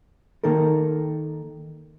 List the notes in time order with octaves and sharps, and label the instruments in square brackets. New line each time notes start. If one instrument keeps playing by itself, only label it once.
[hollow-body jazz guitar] D#3 A#3 D#4 A4 A#4